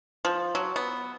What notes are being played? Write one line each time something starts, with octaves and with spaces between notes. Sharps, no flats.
F3
F#3
B3